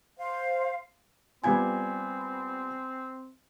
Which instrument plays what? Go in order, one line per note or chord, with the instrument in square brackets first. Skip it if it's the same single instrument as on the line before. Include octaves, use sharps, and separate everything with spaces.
[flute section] C5 F5
[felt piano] G3 B3 F4 [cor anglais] C4 [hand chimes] G#5 G#6